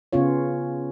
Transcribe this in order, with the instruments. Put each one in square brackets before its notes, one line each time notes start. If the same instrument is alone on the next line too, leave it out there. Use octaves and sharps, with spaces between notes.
[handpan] C#3 B3 C#4 F4 C#5